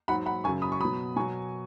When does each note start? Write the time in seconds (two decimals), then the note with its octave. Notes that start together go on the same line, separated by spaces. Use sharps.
0.08 G#2 F#3 F#5 B5
0.26 F#5 B5
0.44 F#2 C#3 F#3 G#5 C#6
0.62 B5 D#6
0.72 C#6
0.80 B2 F#3 B5 D#6
1.16 B2 F#3 G#5 C#6